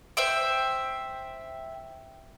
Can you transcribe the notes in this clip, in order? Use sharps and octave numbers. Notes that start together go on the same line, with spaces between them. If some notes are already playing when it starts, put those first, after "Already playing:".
C5 E5 G5